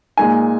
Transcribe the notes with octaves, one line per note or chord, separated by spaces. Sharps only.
A#2 G#3 D#4 G#5